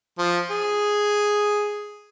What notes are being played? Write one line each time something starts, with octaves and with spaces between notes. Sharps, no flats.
F3
G#4